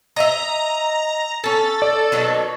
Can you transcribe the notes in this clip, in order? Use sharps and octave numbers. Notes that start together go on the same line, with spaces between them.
D#5 E5 A#5
C#4 A4 A5
D5
B2 D#3 F#3